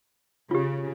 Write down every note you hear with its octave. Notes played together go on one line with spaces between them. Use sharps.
C#3 F4 G4